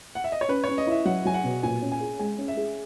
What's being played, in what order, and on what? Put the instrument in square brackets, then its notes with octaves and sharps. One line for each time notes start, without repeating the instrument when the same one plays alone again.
[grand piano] F#5
E5
D#5
C#5
[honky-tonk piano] C#4 [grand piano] B4
[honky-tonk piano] C#4 [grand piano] C#5
[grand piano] D#5
[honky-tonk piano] E4 [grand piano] E5
[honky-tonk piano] F#3 [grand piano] F#5
[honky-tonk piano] F#3 [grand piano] G#5
[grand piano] F#5
[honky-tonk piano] B2
[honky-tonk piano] A#2 [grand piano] G#5
[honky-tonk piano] C#4
[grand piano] G#5
[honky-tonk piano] G#4
[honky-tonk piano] G#3 [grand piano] G#5
[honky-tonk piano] C#4
[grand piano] E5
[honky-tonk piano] G#4